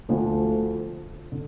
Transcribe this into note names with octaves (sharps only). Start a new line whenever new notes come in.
D2 D3 F3 A3
D3